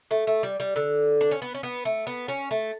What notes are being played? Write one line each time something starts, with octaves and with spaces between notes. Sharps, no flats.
A3
A3
G3
G3
D3
D4
C#4
B3
C#4
B3
A3
B3
C#4
A3